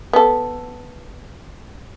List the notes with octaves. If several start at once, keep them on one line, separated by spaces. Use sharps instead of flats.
B3 A4